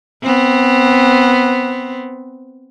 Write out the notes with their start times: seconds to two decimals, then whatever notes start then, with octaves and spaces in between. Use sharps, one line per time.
0.23 B3 C4